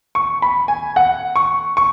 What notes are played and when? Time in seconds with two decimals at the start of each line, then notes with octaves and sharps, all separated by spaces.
0.15 C#6
0.42 B5
0.68 G#5
0.96 F#5
1.36 C#6
1.77 C#6